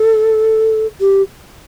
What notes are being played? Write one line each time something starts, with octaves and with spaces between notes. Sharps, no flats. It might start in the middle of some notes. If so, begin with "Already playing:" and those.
Already playing: A4
G4